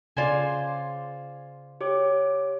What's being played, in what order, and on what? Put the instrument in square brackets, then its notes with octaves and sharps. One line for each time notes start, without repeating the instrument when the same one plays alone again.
[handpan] C#3 D5 [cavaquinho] F4 C5 G#5
[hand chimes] G4 C#5 D6